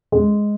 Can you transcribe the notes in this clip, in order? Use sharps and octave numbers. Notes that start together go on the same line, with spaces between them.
G#3